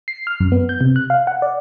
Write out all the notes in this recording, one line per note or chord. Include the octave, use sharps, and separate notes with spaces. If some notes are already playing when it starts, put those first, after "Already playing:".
C7
F6
F#2
B3
G6
C3
F#6
F5
F#5
D5